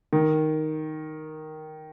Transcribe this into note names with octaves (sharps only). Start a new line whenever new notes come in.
D#3